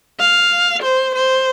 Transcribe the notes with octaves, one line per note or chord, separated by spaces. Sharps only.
F5
C5
C5